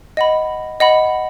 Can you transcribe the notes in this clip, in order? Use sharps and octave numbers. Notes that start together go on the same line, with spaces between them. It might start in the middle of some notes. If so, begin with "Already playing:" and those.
D#5 F#5 B5
D#5 F#5 B5